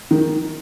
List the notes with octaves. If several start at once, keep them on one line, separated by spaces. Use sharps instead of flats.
D#3